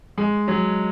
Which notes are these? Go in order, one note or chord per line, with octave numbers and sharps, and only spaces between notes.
G#3
F#3